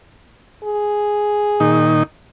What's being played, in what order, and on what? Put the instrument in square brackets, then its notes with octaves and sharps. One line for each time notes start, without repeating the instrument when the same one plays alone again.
[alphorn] G#4
[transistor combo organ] A#2 D#3 D#4